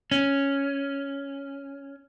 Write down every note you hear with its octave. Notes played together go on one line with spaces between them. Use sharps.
C#4